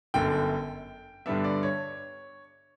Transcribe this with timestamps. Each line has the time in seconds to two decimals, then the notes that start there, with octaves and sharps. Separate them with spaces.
0.14 G1 F#2 D3 G5
1.26 G2 D3 G3 B3 D4 E5
1.44 D5
1.63 C#5